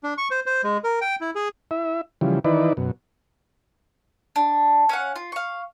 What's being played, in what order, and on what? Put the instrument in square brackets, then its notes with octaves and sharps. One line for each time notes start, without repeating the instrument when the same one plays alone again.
[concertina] D4
C#6
C5
C5
G#3
A#4
G5
E4
G#4
[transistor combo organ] E4 E5
C#3 E3 F3 G3
D#3 E3 D#4 E4 B4 D5
F#2 B2
[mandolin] D4
C#4 F5 F#5
F4
F5 C#6